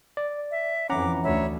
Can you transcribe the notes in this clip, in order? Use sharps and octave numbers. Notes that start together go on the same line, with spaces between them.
D5
E5
F2 E3 C#4 F#5 A#5 D6
D2 C#5 E5 B5